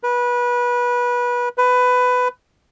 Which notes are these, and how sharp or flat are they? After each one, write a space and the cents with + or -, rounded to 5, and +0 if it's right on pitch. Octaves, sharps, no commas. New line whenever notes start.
B4 -25
B4 +15